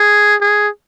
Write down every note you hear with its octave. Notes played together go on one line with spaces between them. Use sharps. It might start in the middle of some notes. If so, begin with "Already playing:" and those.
Already playing: G#4
G#4